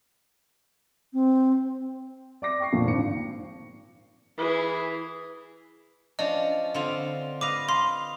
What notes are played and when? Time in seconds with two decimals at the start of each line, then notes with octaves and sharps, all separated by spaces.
1.13 C4
2.42 D5 D6 A#6
2.60 G5 C#6 C7
2.72 F2 A#2 D3
2.85 G#1 C#7
4.38 E3 G#4
6.19 F3 C#4 D4 D5 D#5
6.74 D3 C4 F4
7.41 B4 D#5 F5 D6
7.69 F5 C6